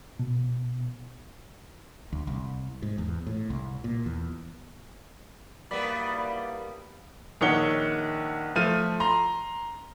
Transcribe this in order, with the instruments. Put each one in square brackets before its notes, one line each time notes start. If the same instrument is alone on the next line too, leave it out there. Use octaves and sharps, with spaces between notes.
[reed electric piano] B2
[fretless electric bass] D2
C2
G#2
E2
A2
C2
A#2
E2
[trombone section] B1 E3 A#3 [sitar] G3 B3 [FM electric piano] D5 B5
[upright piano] A#1 D#3 C#5 F#5 C#7 G7
F3 A3 F6 D#7
A#5 C6